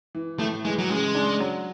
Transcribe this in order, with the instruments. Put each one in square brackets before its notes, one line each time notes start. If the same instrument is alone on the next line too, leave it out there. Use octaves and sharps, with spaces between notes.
[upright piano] E3
[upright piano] A2 [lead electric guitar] A3
[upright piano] E3 [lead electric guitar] G#3
[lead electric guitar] F#3
[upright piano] C#3 [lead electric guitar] G#3
[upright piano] D4
F#3